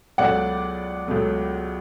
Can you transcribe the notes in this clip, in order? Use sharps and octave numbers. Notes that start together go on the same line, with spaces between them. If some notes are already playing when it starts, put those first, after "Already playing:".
C#2 B2 F#3 A3 D5 F#5
C#2 B2 F#3 A3